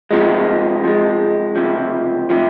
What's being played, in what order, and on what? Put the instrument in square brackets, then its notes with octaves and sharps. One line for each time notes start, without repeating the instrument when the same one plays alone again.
[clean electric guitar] C3 F3 G#3
C3 F3 G#3
C#2 C3 F3
C3 F3